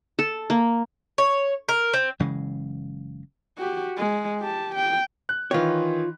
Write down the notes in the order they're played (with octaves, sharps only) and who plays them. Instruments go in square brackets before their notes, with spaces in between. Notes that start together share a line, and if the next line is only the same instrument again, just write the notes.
[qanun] A4
A#3
[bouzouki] C#5
A#4
C4
[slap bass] F#1 C#3 E3 G#3
[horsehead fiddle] F#4 G4
G#3
G4 A5
G5
[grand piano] F#6
[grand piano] D#3 E3 [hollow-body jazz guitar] F4 C#5